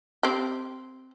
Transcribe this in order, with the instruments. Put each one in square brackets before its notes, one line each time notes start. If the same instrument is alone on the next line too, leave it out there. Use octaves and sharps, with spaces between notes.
[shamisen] C4 G4